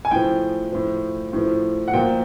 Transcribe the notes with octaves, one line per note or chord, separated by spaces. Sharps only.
G#5
A2 F3 G5
A2 F3
A2 F3
F#5
A#2 F3 G5